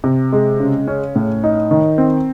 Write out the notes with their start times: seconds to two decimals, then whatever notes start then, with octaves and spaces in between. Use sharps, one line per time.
0.04 C3
0.33 G#3
0.60 C#3
0.87 C#4
1.16 A2
1.44 D#4
1.71 D#3
1.98 C4